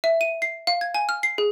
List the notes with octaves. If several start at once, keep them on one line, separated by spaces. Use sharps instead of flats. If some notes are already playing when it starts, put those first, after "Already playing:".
E5
D#7
C7
F5
G#6
G#5
F6
C7
G#4